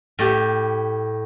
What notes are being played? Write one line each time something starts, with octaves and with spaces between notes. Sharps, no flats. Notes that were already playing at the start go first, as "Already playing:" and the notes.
A2 G4